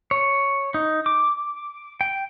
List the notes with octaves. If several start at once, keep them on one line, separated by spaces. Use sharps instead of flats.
C#5
D#4
D6
G5